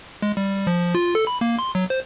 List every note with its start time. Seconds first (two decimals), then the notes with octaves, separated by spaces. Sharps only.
0.22 G#3
0.37 G3
0.67 F3
0.95 F4
1.15 A4
1.27 B5
1.41 A#3
1.59 C6
1.75 F#3
1.90 C5